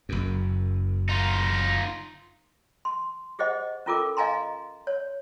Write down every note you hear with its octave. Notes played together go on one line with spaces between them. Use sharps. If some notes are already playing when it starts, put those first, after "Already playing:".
F#1 F#2
D#4 F4
C6
G4 G#4 C5 D#5 F#5
C#4 E4 F4 A4 A#4 D6
D#5 F5 G#5 A#5 C6
C#5